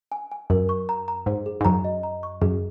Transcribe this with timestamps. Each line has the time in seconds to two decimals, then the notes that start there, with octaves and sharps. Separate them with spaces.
0.12 G#5
0.32 G#5
0.50 F#2 A#4
0.69 C#6
0.89 A#5
1.08 A#5
1.26 G#2 C5
1.46 G#4
1.61 G#2
1.65 F#2 A#5
1.84 D#5
2.03 A#5
2.23 C#6
2.42 F#2 G#4